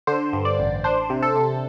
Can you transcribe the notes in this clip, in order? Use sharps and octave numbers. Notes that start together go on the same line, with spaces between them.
D3 C5
G2
D5
A1
D4 C5
C3
A4
C3